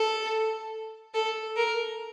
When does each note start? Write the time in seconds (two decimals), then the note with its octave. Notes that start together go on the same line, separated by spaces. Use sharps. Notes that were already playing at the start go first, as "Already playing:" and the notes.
Already playing: A4
1.14 A4
1.56 A#4